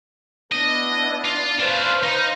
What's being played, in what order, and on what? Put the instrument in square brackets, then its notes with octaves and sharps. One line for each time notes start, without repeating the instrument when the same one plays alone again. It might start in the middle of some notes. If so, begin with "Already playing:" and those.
[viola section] B3 D4 E4 [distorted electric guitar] D#5
[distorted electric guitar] F4
[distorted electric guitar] C#4 D4 [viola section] B4 C5 F5
[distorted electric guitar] D#4